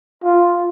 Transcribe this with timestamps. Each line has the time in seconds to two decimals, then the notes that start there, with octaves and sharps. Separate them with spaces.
0.24 F4